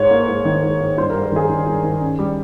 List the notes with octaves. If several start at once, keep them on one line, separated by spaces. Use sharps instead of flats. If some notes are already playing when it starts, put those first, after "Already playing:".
Already playing: G#2 C#5
A#3
G#2
D#3
G#2
G#2
G2 C5
G3 A#4
A#4
D#3 G#4
D#3
G2
D#3
C#4
G3